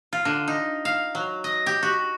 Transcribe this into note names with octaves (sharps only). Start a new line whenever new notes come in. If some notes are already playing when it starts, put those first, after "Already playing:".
F4
D3
D#4
F5
F#3
D#5
G4
F#4